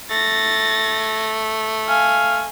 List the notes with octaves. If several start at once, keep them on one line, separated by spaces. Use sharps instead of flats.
A3 A6 A#6
F5 G#5